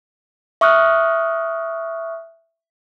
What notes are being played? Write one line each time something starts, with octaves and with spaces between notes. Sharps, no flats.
E5 C#6 D#6 F6 F#6